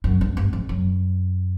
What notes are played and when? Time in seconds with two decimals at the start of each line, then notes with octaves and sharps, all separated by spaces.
0.04 F#2
0.21 G2
0.37 G2
0.53 F2
0.69 F#2